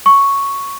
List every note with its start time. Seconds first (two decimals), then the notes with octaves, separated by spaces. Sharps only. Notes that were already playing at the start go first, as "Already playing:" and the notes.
0.06 C#6